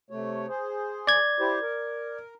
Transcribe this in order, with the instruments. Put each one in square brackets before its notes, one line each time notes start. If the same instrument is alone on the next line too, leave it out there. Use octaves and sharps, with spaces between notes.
[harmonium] C3 A3 C#5
G#4 C5
[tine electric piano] D5 G#6
[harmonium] E4 G4 C5
A#4